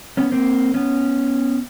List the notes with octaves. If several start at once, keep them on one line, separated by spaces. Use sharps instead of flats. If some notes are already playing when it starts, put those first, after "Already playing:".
B3 C#4
A#3 C4
B3 C#4